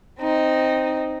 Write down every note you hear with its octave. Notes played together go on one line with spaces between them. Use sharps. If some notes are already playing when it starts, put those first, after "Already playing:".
C4 D#4